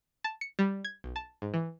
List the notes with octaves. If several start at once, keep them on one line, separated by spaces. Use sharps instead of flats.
A5
C#7
G3
G#6
B1
A5
G#2
E3